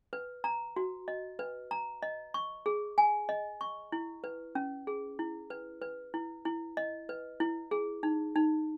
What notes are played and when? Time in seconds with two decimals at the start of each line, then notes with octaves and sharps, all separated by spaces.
0.13 B4
0.44 A#5
0.76 F#4
1.08 D#5
1.39 B4
1.71 A#5
2.03 D#5
2.34 C#6
2.66 G#4
2.98 G#5
3.29 D#5
3.61 C#6
3.92 E4
4.24 B4
4.55 C#4
4.87 G#4
5.19 E4
5.50 B4
5.82 B4
6.14 E4
6.45 E4
6.77 D#5
7.09 B4
7.40 E4
7.71 G#4
8.03 D#4
8.36 D#4